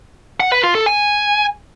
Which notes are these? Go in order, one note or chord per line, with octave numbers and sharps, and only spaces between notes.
F#5
B4
F4
A4
G#5